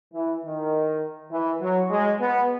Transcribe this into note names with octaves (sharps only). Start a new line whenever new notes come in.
E3
D#3
E3
F#3
G#3
B3